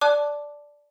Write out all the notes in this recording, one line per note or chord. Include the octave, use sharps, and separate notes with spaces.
D5 A5 D6 F#6